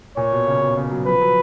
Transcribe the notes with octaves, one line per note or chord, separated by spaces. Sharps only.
A#2 C#5
B2
C#3
B2
C#3
F#3
F3 B4
F#3